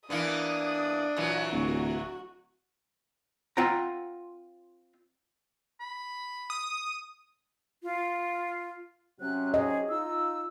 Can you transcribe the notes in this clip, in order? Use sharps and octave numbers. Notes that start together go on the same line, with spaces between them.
E3 A#3 B3 D4 D#6
A#2 E3 F#3
D1 F#4
C4 F4 F#5 G5 A#5
B5
D#6
F4
C3 F#3 C#4 F#6
G#4 D#5
D#4 F4 E6